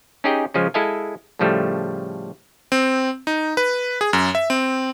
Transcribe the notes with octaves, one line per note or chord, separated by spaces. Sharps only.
C#4 D#4 G4 G#4 D#5 G5
C#3 F3 G#3 C#4
G#3 E4 A4 D#5 F5 G#5
A2 C#3 F3 G3 A3
C4
D#4
B4
G#4
F#2
E5
C4